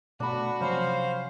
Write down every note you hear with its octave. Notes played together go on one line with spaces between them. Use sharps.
B2 A3 D4 F#4 B5
C3 F3 F#3 C#4 C5 F5 B5